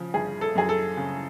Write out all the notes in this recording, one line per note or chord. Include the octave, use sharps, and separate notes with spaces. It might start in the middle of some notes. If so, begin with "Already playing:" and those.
Already playing: C#3 F3
G1 G#4
A4
F#2 G#4
A4
C#3